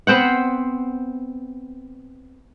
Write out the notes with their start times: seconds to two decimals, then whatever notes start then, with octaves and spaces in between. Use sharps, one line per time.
0.07 B3 C4 C5 F#5